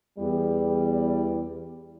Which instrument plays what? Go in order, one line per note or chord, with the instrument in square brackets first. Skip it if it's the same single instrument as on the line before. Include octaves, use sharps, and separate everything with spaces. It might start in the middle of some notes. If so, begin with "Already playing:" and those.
[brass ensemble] E2 G3